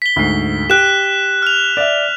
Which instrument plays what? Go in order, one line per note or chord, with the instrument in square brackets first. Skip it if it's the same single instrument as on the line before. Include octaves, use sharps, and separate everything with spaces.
[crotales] B6 G7
[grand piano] D2 G#2 C7
[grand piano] G4 [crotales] F#6 E7
[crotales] F6 F7
[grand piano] D5 E5